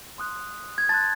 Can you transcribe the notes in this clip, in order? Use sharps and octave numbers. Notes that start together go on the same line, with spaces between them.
C6 D#6 F#6
G#6
A5 C6 F#6 A6